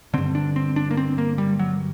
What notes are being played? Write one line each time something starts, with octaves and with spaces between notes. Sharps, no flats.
G2 D3 C4
D4
C4
D4
A#3
C4
A#3
G3
F#3